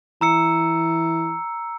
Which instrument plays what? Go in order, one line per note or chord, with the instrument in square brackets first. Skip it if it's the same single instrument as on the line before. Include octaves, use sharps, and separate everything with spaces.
[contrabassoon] E3 [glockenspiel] A#5 E6 C#7